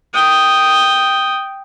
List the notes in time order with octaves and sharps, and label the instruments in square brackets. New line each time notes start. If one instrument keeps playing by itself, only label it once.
[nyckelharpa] G5 D#6